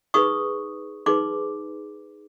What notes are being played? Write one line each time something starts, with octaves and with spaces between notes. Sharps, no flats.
D#4 G#4 B4 C#6 D#6
D#4 G#4 B4 C6 D6